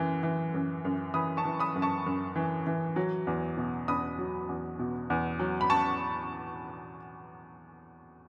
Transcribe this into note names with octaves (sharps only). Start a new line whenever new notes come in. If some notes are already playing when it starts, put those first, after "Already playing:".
Already playing: F#2 E3
E3
F#2
F#2
E3 B5 D#6
A5 C#6
E3
B5 D#6
F#2
A5 C#6
F#2
E3
E3
F#3
E2
B2
E2 B5 D#6
F#3
E2
B2
E2
F#3
B5
A5 C#6